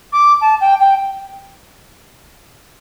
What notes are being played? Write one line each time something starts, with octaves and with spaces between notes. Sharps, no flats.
D6
A5
G5
G5